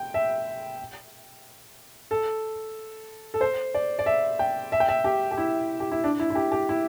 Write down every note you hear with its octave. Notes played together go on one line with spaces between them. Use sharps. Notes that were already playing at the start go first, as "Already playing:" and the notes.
Already playing: G5
E5
A4
A4
C5
D5
D5
E5
G5
E5
G5
E5
G4
G4
E4
G4
E4
D4
E4
E4
G4
G4
E4